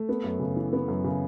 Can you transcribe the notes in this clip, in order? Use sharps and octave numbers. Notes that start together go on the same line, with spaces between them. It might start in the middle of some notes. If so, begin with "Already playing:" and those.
Already playing: A3
B3
F#2
C#3
E3
B3
F#2
C#3